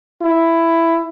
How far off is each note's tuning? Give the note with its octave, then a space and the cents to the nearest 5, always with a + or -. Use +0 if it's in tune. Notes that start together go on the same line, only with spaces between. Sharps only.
E4 +10